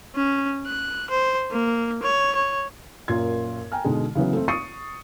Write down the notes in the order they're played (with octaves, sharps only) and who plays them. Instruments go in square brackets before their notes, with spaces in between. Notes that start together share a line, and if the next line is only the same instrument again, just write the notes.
[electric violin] C#4
F#6
C5
A#3
C#5
C#5
[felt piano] F#2 A#2 F4 A#4 C6 G#6
G5 G#5 A#5 F6
G#2 B2 D3 G#3
C#3 E3 F#3 B3
A3 C4
C#6 D#6 A6 C7 C#7 D#7